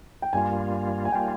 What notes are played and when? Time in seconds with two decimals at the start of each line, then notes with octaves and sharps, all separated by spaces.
0.22 G5
0.33 G2 G3 A#3 F4 G#5
1.05 G#5
1.12 G3 A#3 F4 G5